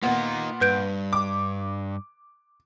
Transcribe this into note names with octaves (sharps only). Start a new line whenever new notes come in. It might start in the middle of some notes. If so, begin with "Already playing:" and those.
A#2 A#3 B3 D#4
G2 B4 G6 D7
D6